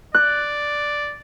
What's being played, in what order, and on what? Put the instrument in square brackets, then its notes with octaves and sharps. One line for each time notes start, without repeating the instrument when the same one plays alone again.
[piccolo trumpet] D5 [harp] F#6